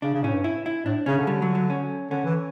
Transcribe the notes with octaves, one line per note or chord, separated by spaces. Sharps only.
C#3 D4
C#3
A2 C#4
G2
E4
E4
A2 D4
C#3 C#4
D3
G3
F#3
F#3
C#4
D3 C#4
E3